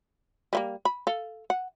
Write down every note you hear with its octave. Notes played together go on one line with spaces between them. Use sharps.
G3 A3 A#3
B5
A4 F5
F#5